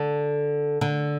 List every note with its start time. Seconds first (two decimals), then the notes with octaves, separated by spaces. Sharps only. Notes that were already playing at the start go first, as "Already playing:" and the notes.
Already playing: D3
0.81 D3